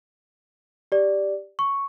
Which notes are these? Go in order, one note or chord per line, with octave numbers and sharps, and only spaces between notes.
G4 D5
C#6